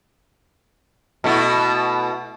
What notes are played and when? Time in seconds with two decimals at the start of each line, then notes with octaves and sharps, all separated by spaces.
1.24 B2 A3 E4